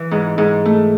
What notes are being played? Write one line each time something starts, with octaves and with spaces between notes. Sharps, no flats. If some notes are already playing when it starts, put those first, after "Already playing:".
Already playing: E3
G#2
G#2
A3